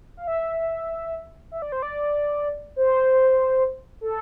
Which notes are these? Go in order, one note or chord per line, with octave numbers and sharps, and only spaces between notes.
F5
E5
E5
D5
C5
D5
C5
A4